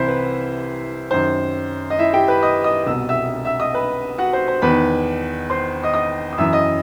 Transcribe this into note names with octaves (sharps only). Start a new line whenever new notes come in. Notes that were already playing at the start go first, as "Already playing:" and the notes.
Already playing: C2 C3 E3 E4 C5 E5
B4
F#2 D#3 C5
D#5
E4 E5
G4 G5
B4 B5
D#5 D#6
D#5 D#6
C2 B2 E6
E5 E6
E5 E6
D#5 D#6
B4 B5
F#4 F#5
C5
C5
E2 D#3 B4 B5
C5 C6
D#5 D#6
D#5 D#6
D#6
F#2 E3 E5 E6
D#5 D#6